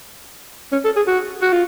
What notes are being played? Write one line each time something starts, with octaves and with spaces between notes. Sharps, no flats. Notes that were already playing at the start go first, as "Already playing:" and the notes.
C#4
A4
G#4
F#4
F#4
F4